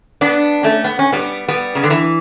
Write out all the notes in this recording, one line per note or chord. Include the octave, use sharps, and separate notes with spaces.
B3 D4
A3 C#4
B3
C#4
G3 B3
G3 B3
C#3
D3
E3